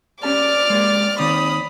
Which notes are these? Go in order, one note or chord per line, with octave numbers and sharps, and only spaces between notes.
C#4 G4 D5 A5 D6 F6
G#3 A#3 G4
D#2 D#3 C4 B5 D#6